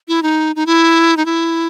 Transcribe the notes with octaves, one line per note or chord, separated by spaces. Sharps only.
E4
D#4
D#4
E4
D#4
E4